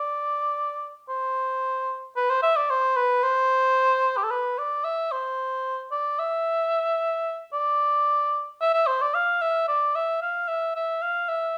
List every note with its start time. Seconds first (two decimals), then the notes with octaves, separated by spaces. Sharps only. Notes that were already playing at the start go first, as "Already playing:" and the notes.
Already playing: D5
1.09 C5
2.16 B4
2.30 C5
2.43 E5
2.56 D5
2.70 C5
2.96 B4
3.23 C5
4.17 G4
4.24 A4
4.31 B4
4.58 D5
4.84 E5
5.12 C5
5.92 D5
6.19 E5
7.53 D5
8.61 E5
8.74 E5
8.87 C5
9.02 D5
9.14 F5
9.42 E5
9.68 D5
9.95 E5
10.22 F5
10.48 E5
10.76 E5
11.02 F5
11.29 E5